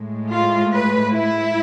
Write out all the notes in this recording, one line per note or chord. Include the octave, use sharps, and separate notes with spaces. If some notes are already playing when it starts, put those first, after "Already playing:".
Already playing: A2 G#3
F4
B4
E4